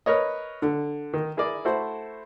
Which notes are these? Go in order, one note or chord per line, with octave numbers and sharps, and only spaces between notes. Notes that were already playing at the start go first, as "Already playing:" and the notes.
A#4 B4 C#5 D#5
D3
D#3
E4 G#4 A#4 D5
A3 E4 F#4 A4 C5